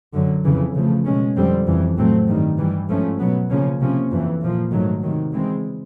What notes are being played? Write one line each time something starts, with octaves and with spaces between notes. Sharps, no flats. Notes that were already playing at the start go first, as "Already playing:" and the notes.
F#2 D3 F#3
F2 C#3 E3
C#3 F3 A3
B2 G#3 C#4
F2 D3 G3 C4
F2 C#3 E3
A2 F#3 A3 C4
G2 D#3 G3
G2 E3 G3
G#2 F3 A3 C#4
B2 F#3 B3
C#3 F3 A#3 C#4
C3 F3 A#3 C#4
F2 C#3 E3
A#2 F3 A#3
G#2 D#3 F#3 A3
C3 D#3 F#3
C#3 E3 G#3 C4